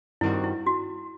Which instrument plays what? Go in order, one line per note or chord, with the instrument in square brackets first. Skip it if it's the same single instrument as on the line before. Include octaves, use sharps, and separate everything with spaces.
[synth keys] G2 D#3 G3 C4 F#4 [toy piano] E4
[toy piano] E4
F#4